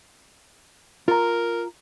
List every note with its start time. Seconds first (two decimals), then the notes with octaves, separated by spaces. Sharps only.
1.08 F4 A#4 A#5